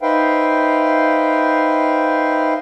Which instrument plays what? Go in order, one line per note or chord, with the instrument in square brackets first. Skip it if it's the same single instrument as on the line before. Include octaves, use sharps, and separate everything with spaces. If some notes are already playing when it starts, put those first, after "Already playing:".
[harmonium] D#4 B4 C5 E5 F5 G5